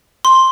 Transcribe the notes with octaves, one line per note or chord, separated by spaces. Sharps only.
C6